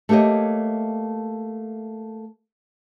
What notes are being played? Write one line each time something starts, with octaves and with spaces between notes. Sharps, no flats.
A3 A#3 G4 C#5 D#5